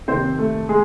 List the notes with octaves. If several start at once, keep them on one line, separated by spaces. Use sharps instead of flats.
C3 D#3 C4 C5
A3 A4
G#3 G#4